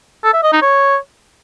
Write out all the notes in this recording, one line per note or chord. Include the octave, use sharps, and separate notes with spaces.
A4
E5
D#5
D#4
C#5